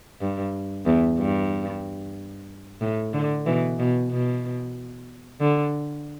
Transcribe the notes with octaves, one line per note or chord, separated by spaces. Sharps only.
G2
E2
G2
A2
D3
B2 E3
B2
B2
D3